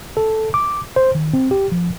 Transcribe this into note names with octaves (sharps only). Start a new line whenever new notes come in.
A4
D6
C5
D#3
C4
G4
F3